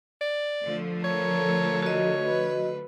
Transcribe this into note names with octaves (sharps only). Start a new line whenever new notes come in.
D5
D3 F3 A3
A4 A#4 C#5
F#4 C#5 D#5
B4